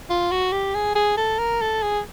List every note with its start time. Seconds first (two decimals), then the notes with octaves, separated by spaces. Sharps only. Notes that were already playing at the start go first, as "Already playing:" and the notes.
0.10 F4
0.31 F#4
0.52 G4
0.75 G#4
0.95 G#4
1.17 A4
1.39 A#4
1.61 A4
1.83 G#4